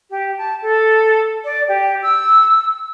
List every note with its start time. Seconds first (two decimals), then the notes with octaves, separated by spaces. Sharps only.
0.10 G4
0.37 A5
0.62 A4
1.44 D5
1.68 G4
2.02 E6